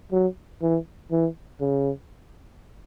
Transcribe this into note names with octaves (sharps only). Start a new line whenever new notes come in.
F#3
E3
E3
C#3